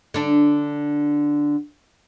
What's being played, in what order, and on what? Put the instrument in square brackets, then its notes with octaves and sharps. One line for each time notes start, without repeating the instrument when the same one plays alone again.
[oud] D3 D4